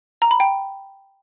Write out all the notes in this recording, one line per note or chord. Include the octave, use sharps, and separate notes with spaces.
A#5
B5
G5